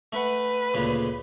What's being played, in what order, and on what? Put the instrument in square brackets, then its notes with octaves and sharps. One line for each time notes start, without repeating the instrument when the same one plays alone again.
[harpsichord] A3 F#5 [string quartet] B4
[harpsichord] D2 A#2 C#3